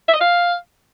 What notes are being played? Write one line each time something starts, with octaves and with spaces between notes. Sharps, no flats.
E5
D#5
F5